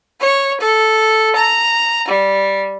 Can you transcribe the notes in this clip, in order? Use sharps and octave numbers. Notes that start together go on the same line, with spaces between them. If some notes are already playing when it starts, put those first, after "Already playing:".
C#5
A4
A#5
G3